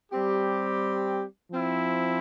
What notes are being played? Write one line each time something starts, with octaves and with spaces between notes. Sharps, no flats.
G3 C4 G4
F3 C4 E4